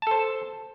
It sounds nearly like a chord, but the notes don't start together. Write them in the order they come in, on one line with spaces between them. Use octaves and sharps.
A5 A4 C5